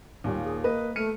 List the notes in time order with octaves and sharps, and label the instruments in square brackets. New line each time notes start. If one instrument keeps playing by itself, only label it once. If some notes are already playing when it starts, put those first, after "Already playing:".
[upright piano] D#2 A#2 [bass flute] G3
[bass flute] G#4
[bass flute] A#3 [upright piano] B4 D#5
[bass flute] A3 [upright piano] F6 C#7 D#7